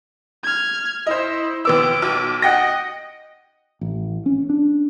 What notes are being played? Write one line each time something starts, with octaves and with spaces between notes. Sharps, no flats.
F6 G#6
E4 C5 D#5
D#2 B3 D6 E6
B1
D#5 F#5 G5 A#6
A1
C#4
D4